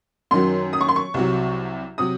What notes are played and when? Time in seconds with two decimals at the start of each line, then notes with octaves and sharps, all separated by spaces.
0.31 F#2 D#3 F#3 C6
0.73 D#6
0.81 C#6
0.88 C6
0.96 C#6
1.14 C2 C3 F#3
1.98 C3 F#3 D#6